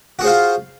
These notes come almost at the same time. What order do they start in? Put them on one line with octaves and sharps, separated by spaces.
F#4 G#4 C5 F4